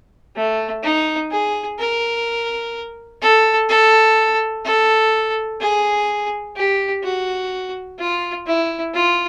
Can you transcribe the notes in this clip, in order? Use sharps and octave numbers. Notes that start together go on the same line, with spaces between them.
A3
D#4
G#4
A#4
A4
A4
A4
G#4
G4
F#4
F4
E4
F4